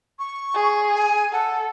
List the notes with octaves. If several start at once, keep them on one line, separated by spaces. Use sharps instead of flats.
C#6
G#4
G#5
A4 F#5